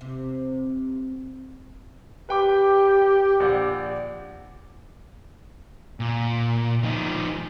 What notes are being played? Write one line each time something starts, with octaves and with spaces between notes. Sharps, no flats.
C3
G4 B4 G5 D6
A#1 D5 F#5
A#2
F3 D#4